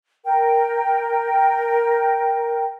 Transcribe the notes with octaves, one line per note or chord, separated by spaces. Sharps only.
A#4 G5